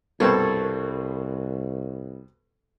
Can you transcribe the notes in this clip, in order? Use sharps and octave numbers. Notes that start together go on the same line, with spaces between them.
C2 G2 B2 C4 A4 A#4 C#6 G#6